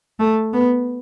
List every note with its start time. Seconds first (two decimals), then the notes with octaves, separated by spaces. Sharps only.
0.19 A3
0.53 B3